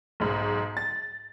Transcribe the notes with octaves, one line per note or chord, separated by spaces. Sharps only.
B1 G#2
A6